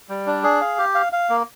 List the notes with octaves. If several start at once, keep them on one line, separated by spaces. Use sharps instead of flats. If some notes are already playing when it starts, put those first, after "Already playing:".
G3
D4
G#4
F5
G4
F5
F5
A#3